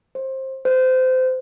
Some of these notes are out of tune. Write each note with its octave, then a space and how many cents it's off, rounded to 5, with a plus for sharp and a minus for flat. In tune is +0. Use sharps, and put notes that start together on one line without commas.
C5 +20
C5 -25